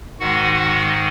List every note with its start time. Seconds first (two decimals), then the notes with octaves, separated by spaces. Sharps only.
0.20 G#2 D#3 G#3 F#4 F#5
0.53 F#4 F#5